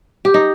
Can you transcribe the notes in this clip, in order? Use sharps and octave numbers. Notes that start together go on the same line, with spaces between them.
G4
D#4